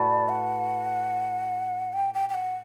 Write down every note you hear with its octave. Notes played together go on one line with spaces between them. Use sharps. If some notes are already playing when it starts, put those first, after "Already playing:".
Already playing: A2 F#4 B4 D5
F#5
G5
G5
G5
F#5